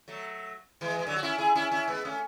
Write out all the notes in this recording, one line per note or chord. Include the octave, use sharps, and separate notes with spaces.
F#3 A3
E3 G#3
G#3
D3 F#3
F#4
C#4 E4
E4 G#4
C#4 E4
C#4 E4
G#3 B3
A3 C#4